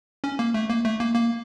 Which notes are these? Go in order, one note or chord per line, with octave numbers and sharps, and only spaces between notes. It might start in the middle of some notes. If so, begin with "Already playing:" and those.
C#4
A#3
A3
A#3
A3
A#3
A#3